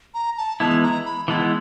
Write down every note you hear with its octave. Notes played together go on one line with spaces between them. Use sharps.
A#5
A5
E3 G#3 B3 E4 A5
A#5
B5
E3 G#3 B3 E4 A5